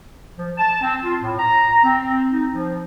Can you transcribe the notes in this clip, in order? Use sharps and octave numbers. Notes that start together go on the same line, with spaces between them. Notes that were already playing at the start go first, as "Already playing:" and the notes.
F3
A5
C4
F4
A2
A#5
C4
D#4
F3